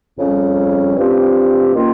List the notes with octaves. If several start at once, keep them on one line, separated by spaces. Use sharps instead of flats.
F2 C#3 G3 C#4
G2 F3 C4 G4
D#3 A#3 C#4 F4